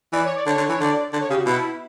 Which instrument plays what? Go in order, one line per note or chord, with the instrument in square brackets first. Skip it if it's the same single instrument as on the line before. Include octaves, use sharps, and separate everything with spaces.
[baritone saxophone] E3 [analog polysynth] D5
[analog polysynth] C#5
D5
[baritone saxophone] D3 [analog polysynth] C#5
[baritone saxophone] D3
[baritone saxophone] E3 [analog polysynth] C#5
[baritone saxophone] D3 [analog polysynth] D5
[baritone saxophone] D3
[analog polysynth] C#5
[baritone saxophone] C#3 [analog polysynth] G4
[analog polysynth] F#4
[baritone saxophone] B2 [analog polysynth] E4